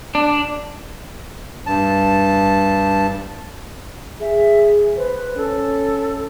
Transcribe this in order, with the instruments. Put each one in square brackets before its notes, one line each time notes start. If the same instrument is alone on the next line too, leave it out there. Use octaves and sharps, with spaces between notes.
[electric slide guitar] D4
[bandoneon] G2 A5
[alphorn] G#4 [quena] E5
[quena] B4 [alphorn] C5
[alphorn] C#4 [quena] A4